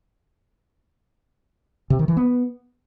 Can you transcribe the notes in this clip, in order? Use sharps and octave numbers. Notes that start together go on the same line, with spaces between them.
C3
D#3
E3
B3